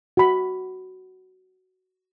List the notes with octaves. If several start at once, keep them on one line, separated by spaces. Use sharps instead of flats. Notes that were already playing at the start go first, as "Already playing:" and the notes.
F#4 B5